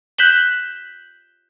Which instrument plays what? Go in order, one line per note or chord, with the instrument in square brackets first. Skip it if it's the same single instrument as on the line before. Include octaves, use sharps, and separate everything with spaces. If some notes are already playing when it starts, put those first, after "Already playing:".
[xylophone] F#6 G6 B6 E7 F#7 G7